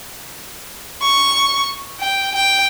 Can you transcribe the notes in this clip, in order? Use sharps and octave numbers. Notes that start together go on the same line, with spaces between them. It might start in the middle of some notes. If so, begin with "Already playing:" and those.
C#6
G5
G5